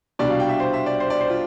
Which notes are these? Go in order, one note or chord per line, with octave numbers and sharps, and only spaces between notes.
C2 B2 G3 D4 D5
F5
G5
E5
C5
E5
D5
C5
D5
C5
F4